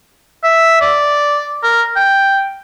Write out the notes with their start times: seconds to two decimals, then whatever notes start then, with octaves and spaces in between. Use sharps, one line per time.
0.43 E5
0.81 D5
1.63 A#4
1.96 G5